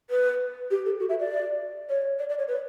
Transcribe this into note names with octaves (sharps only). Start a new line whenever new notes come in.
B4
G4
A4
F#4
E5
D5
C#5
D5
D5
C#5
B4